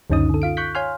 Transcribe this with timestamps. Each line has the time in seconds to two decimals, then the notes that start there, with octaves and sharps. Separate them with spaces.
0.10 C#2 F#2 D3 C#4 D#4 D#6
0.30 D3 A4
0.42 F4 F5 D7
0.57 C#6 F#6 G6 B6
0.75 C#5 F5 G#5 C6 F6